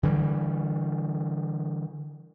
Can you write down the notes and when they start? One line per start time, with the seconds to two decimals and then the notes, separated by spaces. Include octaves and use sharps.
0.03 D3 E3 G3